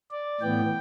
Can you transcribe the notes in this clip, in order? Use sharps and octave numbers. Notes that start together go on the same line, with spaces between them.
D5
A2 E3 B3 G5